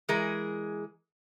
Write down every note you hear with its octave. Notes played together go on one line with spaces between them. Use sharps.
E3 G#3 G#4 A#4